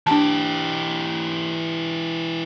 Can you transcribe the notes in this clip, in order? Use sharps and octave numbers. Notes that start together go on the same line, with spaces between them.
E3 D4 G4 A5